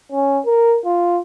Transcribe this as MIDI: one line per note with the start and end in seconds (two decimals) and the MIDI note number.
0.12 0.39 61
0.45 0.78 70
0.85 1.20 65